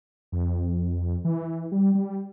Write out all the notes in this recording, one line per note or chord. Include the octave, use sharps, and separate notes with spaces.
F2
E3
G3
G3